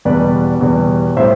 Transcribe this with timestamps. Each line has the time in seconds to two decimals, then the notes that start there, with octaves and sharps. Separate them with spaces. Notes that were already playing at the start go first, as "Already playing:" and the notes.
0.05 E2 B2 G3 B4 D5
0.61 E2 B2 G3
1.17 A2 G3 C5 E5